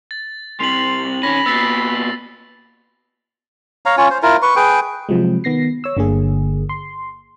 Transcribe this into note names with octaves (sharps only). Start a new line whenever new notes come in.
A6
C2 C3 C6 F7 F#7
D#3 C#4 B5 A#6
A#2 B3 E6 A6 C7
C#5 F5 A#5
C#4 F4 C#5
C5
E4 F4 A#4
B4 C#6
G#4 B4 G5
C3 F3 F#3 G#3
D#3 B3 A#6 C7
C#5 E6
G1 D3 A#3 G#4
C6